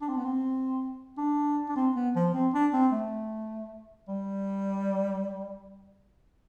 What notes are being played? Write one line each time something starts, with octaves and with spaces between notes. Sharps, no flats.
D4
C4
B3
C4
D4
D4
C4
B3
F3
C4
D4
C4
A3
G3